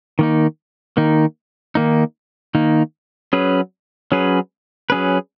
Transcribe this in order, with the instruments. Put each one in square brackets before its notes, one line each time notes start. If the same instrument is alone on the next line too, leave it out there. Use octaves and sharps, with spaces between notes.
[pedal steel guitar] D#3 A#3 D#4
D#3 A#3 D#4
D#3 A#3 D#4
D#3 A#3 D#4
F#3 C#4 G#4 B4
F#3 C#4 G#4 B4
F#3 C#4 G#4 B4